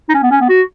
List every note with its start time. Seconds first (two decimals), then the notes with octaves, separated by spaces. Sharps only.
0.09 D#4
0.14 C#4
0.23 B3
0.31 C#4
0.41 B3
0.49 F#4